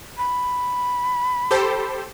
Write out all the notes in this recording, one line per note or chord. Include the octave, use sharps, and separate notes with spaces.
B5
G4 A4 C5